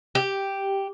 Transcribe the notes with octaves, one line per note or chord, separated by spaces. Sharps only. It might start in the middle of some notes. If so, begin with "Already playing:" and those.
G4